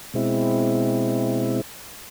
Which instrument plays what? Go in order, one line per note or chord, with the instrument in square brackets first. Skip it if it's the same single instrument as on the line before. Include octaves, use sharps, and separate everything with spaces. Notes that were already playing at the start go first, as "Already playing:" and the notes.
[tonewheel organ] B2 G#3 C4 E4